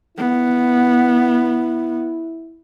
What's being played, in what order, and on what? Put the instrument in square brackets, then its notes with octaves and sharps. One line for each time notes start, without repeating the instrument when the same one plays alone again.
[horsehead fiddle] B3 [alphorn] E4